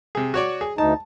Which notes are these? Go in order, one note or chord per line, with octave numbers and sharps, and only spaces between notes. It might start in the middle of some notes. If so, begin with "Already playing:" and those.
C3 G#4
F#4 C#5 D5
G#4
D2 D#4 A5